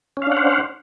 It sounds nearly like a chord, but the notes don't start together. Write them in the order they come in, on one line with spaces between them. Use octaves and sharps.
C#4 F5 D4 F#5 C5